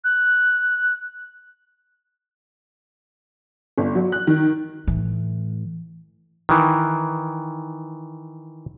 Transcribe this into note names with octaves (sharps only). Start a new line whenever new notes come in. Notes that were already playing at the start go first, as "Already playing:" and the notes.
F#6
G1
F#3
F#6
D#3
A2 E3
D#3 E3